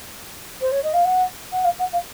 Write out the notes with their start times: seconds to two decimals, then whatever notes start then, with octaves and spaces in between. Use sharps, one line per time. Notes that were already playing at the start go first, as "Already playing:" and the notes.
0.60 C5
0.71 C#5
0.83 D#5
0.93 F5
1.04 F#5
1.52 F#5
1.64 F5
1.79 F#5
1.92 F5